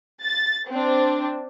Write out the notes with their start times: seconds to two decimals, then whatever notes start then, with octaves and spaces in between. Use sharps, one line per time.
0.23 A6
0.71 C4 D4